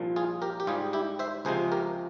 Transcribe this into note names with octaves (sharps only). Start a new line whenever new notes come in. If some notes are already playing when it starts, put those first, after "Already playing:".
Already playing: C2 A#2 F3
F4 G#4
G4 A#4
G4
G#2 G3 F4 G#4
E4 G4
C5 E5
C#2 C3 F3 G#3 G#4 C5
G4 A#4